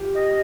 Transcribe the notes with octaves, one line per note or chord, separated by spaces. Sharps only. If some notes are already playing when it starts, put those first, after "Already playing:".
Already playing: F4 G4
G4 D#5